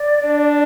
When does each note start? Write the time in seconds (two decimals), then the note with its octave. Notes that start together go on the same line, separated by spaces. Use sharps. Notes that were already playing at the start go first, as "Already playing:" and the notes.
Already playing: D5
0.24 D4